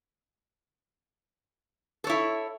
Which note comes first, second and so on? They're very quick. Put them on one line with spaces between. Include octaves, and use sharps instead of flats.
A4 C#5 E4